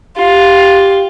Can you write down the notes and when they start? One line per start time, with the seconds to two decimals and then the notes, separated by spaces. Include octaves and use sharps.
0.18 F4 G4